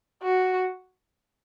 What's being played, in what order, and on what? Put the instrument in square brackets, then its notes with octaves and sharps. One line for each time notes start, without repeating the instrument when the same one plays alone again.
[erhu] F#4